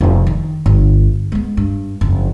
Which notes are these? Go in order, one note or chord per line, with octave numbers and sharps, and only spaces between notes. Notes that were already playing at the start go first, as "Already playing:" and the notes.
F1 C3
D#3
G1
G#3 B3
G2
F#1 F2